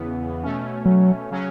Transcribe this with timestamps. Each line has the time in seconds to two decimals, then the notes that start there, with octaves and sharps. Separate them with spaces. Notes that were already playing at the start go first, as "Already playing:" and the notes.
Already playing: E2 C#3 E3 B3
0.43 B2 A3 C#4
0.86 F#3
1.29 C#3 F#3 C#4